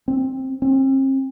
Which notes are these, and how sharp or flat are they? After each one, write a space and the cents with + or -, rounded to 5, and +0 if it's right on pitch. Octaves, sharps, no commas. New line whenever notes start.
C4 +10
C4 +40